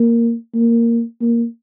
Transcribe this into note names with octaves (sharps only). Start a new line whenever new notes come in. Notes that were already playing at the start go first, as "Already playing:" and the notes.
Already playing: A#3
A#3
A#3